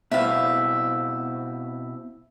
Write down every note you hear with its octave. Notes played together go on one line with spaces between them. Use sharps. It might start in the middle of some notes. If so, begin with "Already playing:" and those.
B2 C4 E4 E5 F5